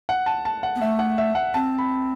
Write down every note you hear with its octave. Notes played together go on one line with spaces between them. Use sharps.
F#5
A5
A5
F#5
B3
A3 E5
F#5
E5
F#5
C4 A5
B5